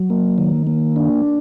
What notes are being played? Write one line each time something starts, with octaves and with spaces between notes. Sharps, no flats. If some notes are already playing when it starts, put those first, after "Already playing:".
Already playing: F#3
A#3
D#3
A#3
D4